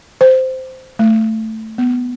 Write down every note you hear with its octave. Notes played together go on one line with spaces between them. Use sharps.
C5
A3
B3